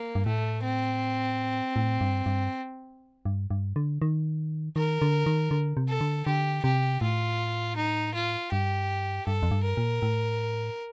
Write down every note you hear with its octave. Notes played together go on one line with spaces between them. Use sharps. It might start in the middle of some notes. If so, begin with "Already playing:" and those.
Already playing: A#3
G2
A2 A3
C4
A2
G2
G2
G2
G2
D3
D#3
D#3 A#4
D3
D#3
D3
C3
A4
D3
D3 G4
C3 G4
A2 F4
D#4
F4
G2 G4
G2 A4
F2
G2
A#4
A#2
A2